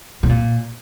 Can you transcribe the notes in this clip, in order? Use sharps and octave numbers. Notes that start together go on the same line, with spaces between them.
B2
A#2